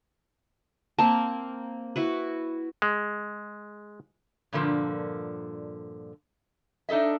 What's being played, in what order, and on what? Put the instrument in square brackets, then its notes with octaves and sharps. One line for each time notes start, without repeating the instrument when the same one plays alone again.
[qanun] A#3 C4 [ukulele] A5
[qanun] E4 F#4 B4
[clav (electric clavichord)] G#3
[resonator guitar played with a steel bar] G2 A#2 D3 F3 A#3
D4 D#4 A4 D#5 E5